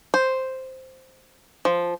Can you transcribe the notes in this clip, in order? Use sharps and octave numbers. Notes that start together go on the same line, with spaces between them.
C5
F3